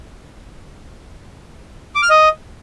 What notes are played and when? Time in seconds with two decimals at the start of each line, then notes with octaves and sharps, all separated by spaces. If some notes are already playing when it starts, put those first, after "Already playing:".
1.95 D6
2.02 F6
2.10 D#5